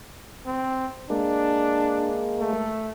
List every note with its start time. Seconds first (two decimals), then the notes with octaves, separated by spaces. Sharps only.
0.46 C4
1.10 G#3 A#3 D4
2.39 A3